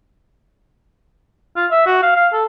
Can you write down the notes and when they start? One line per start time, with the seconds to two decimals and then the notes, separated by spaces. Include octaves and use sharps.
1.56 F4
1.71 E5
1.86 F#4
2.03 F5
2.16 F5
2.33 A4